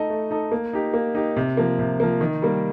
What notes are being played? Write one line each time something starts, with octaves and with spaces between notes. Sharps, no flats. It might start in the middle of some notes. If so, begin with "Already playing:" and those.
Already playing: A3 D#4 A4 D#5
A3
D#4 A4 D#5
A#3
D#4 G4
A#3
D#4 G4
C3
F3 A#3
C3
F3 A#3
D#3
G3 A#3